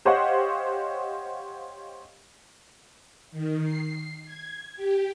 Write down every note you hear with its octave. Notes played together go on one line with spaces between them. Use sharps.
G4 C5 C#5 D#5 F5 F#5
D#3
C7
G#6
G4